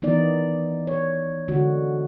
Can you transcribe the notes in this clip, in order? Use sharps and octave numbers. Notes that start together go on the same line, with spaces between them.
D#3 E3 B3 D#4 D5
C#5
D3 G#3 F#4